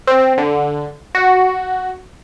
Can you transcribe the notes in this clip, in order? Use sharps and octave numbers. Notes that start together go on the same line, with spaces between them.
C4
D3
F#4